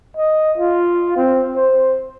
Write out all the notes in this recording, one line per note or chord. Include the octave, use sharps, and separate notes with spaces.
D#5
F4
C4
C5